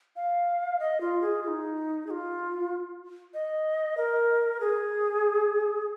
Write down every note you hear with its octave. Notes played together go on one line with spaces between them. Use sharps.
F5
D#5
F4
G#4
F4
D#4
G#4
F4
D#5
A#4
G#4